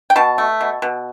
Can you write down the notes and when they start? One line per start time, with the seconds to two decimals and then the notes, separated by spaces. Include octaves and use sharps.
0.10 G5
0.16 B2 A5
0.38 A3
0.61 B2
0.82 B2